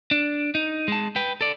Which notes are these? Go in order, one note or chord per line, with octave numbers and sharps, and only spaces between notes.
D4
D#4
G#3 A5
B4 G5
A4 D5